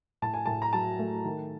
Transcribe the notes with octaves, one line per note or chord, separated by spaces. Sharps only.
A2 A5
G#5
A2 A5
A#5
F#3 A5
A3
D#3